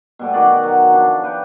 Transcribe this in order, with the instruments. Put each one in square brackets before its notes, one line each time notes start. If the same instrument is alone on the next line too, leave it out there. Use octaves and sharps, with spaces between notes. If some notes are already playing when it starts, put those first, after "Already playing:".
[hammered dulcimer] B2 G3 A3
D#3 F#4 G#4 D5
F#3
F3 D4
B4 G5 C#6